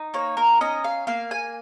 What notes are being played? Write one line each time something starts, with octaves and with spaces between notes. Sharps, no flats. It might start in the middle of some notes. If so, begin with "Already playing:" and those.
Already playing: D#4
A#3 C#5
A#4
C#4 D#5
F5
A#3 F5
G#5